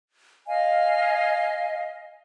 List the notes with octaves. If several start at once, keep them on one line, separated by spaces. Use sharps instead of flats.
D#5 F5 G#5